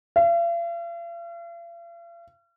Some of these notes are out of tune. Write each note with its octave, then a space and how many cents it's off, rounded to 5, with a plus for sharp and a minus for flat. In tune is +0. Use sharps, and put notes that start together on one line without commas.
F5 -45